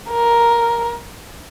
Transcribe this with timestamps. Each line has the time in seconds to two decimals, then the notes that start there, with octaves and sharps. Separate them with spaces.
0.10 A#4